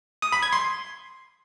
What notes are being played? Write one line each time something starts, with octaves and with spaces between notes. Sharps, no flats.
D#6
B5
G#6
C6